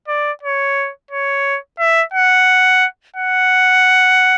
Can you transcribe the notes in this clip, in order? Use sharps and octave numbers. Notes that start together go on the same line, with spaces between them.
D5
C#5
C#5
E5
F#5
F#5